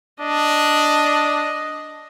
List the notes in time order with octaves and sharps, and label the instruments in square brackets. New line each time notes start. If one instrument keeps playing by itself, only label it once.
[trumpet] D4 [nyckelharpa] D#5